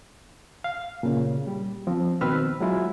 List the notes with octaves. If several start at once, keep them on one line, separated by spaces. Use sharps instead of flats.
F5
A#2 C#3
G3
F3 C4
B2 D#3 C4 B4 E6 F6
F#3 G#3 E4 F4